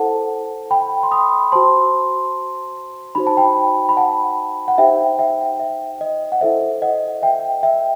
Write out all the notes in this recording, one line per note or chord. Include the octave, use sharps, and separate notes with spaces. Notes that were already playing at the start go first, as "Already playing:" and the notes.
Already playing: E4 A4 C5 F#5 A5
G5 B5
C6
B5 D#6
F#4 C5 A5 C6
D#4 F#4 C5 B5
A5
G5 B5
B5
F#5 A5
F#5
D#4 G4 C5 E5 G5
E5 G5
E5
D#5
F#5
E4 A4 C5 E5
D#5 F#5
E5 G5
E5 G5